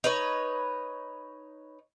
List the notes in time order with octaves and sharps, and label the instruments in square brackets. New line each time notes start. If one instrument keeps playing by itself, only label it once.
[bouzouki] D#4 B4 C#5